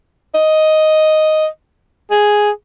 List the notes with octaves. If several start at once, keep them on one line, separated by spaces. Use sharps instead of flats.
D#5
G#4